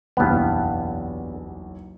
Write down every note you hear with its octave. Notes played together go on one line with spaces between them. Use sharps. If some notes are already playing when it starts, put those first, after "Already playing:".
F#1 B1 E2 G2 B3